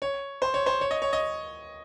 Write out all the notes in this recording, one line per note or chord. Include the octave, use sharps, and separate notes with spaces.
C#5
C5
C#5
C5
C#5
D#5
C#5
D#5